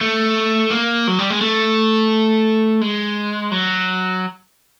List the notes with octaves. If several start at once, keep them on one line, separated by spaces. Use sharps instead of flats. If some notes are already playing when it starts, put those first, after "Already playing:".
A3
A#3
F#3
G3
G#3
A3
G#3
F#3